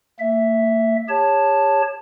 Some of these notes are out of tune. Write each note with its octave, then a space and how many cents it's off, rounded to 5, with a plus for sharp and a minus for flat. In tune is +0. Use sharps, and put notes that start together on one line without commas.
A#3 -40 E5 +0
G4 +40 C#5 +0 A5 +0